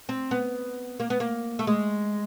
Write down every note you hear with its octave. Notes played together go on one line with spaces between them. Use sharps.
C4
B3
A#3
B3
A#3
A3
G#3